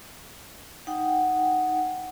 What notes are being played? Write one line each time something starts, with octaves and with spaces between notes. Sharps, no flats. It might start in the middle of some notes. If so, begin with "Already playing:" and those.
D#4 F#5 G5